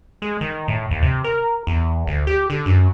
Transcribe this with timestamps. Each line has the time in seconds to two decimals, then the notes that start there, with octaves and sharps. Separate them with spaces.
0.22 G#3
0.41 D#3
0.68 A2
0.91 D#2
1.02 C3
1.24 A#4
1.67 E2
2.07 D2
2.27 G4
2.50 D3
2.66 F#2